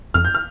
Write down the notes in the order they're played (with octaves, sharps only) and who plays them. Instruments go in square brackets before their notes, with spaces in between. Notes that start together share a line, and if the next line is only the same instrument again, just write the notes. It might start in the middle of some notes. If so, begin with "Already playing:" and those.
[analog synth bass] F2 [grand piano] F6
[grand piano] G6
F6